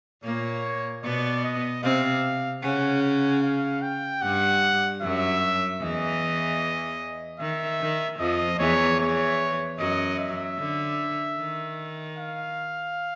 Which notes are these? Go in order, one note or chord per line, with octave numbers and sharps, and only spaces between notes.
A#2 A#3 C#5
B2 B3 D5
D#5
C3 C4 F5
C#3 C#4 F#5
F#5
F5
G5
G2 G3 F#5
F#2 F#3 E5
E2 E3 D#5
D#3 E5
D#3
F2 F3 D#5
E2 E3 C#5
E2 E3 C#5
F#2 F#3 D#5
E5
D3
D#3
F5